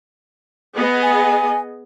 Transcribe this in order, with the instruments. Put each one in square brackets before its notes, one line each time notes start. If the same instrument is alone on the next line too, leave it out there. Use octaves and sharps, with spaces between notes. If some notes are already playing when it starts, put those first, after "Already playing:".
[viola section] B3 G#4 D#5
[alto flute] G#5